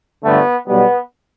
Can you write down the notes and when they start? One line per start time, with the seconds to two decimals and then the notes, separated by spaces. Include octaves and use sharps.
0.24 G1 G2 D3 A3 B3
0.67 B1 B2 G3 B3